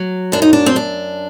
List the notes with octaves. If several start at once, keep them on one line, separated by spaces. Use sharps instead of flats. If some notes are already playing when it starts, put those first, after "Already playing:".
Already playing: F#3
F#2 D4
D#4
D4
C4
F#2 D4